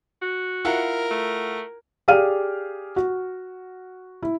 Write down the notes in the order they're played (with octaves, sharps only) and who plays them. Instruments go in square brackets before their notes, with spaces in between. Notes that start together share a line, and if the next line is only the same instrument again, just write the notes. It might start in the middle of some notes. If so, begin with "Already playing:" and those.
[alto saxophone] F#4
[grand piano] E4 F4 F#5 [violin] A#4
[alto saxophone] A3
[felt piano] G4 G#4 D5 F5 F6 D#7
F#4
E4